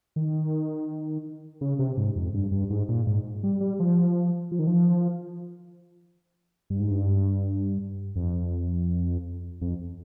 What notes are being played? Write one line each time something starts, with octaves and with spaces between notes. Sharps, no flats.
D#3
C#3
C3
G#2
F2
G2
G2
G#2
A#2
G#2
G3
G3
F3
F3
D#3
F3
G2
G#2
G2
F2
F2